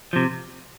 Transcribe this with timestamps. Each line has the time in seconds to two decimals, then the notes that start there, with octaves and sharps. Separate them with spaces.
0.13 C3 F3